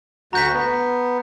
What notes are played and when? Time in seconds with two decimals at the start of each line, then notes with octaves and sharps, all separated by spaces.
0.33 D2 F#4 A#5 G6 B6
0.54 B3